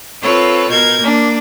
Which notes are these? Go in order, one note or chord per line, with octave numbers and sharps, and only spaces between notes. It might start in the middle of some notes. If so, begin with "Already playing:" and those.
C4 F4 A4 B4 C#5
B2 A#4 G6 G#6
A#3 D4